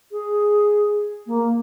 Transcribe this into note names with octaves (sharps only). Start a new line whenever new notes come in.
G#4
A#3